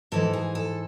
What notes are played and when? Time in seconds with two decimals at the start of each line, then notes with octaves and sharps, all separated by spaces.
0.12 G#2 E3 A4
0.33 G#4
0.55 A4